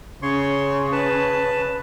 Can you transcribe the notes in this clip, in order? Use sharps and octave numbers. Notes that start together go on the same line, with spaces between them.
C#3 C#5 C6 C#6
B4 A5